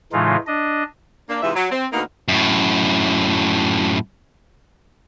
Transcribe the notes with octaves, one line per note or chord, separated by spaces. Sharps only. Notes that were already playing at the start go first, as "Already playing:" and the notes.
A2 C#3 E3 G#3 D#4 F4
D4 D#5
A#3 D4
G#2 C3 E3 G#3 F4 E5
F#3
C4
D2 A#3 B3 D#4 A#4
F#2 A2